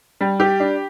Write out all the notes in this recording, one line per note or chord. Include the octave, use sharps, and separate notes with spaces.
G3
G4
D4